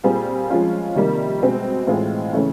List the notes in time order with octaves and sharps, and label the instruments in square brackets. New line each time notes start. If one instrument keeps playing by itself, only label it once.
[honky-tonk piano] A#2 G3 C4 F4 G#4
F3 G#3 C#4 F4
C3 D#3 G3 A#3
B2 G#3 C4
A2 E3 G#3 C4 F4
C#3 E3 A3 C#4